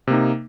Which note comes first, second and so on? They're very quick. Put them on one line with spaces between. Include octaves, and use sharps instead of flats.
C3 A#3 D#4